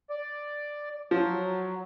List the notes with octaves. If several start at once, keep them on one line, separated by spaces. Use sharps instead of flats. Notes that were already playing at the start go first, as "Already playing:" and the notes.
D5
F3 F#3